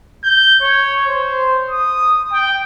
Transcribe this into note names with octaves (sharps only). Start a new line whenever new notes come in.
G6
C#5
C5
D#6
G5